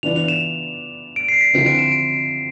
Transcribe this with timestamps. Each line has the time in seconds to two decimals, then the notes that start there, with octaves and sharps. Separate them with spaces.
0.03 E3 B3 D4 F4 F7
0.16 F7
0.28 E7
1.16 D7
1.28 C7
1.41 B6
1.53 D3 F3 C4 E4 C7
1.66 D7
1.78 E7
1.92 D7
2.10 C7